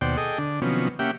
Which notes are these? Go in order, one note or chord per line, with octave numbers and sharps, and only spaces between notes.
D#2 B2 C5 D5 F#5 G5
G#4 A4 D#5 G5
D3 D4
C3 D#3 F3 F#3 B3 C#4
A#3 C#4 G4 E5 F#5 G5